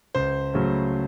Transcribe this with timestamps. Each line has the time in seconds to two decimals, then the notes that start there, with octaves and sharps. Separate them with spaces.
0.15 C#2 C5
0.54 C#3 F#3 A3 C#4